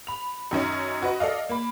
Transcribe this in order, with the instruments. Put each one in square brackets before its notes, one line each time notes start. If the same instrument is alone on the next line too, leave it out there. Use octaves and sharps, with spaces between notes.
[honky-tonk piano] B5 F7
F#2 D#3 C#4 D#4
F#4 B4 D#5
A4 D5 D#5 F5
A#3 B5